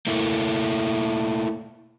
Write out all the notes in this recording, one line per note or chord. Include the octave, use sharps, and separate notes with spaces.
A3 A#3 E4